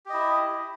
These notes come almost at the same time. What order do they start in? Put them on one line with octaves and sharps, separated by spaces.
G4 D#5 E4